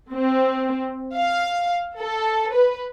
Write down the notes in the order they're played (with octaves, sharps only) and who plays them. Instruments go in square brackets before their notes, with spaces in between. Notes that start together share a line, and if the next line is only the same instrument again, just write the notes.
[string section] C4
F5
A4
B4